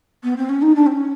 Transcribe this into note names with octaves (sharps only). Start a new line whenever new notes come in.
B3
C4
C#4
D#4
D4
C4
C#4